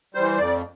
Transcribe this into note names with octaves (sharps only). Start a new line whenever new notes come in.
E3 G3 C5
F2 D5